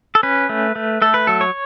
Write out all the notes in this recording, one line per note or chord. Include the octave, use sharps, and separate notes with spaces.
A4
C#4 B4
A3
A3
A3 A4
B4
F#3 A4
C#5